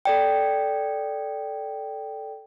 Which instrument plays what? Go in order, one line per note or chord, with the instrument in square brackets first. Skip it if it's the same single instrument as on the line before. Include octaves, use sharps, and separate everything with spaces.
[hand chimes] A4 D5 G5